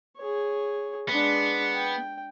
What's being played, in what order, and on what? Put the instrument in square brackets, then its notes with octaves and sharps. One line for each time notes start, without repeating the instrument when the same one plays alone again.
[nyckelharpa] G#4 C#5
[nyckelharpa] G#3 D4 [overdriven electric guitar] B3
[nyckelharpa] G5